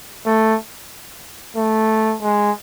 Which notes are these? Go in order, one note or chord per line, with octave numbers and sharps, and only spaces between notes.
A3
A3
G#3